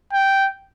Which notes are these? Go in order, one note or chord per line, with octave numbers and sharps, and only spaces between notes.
G5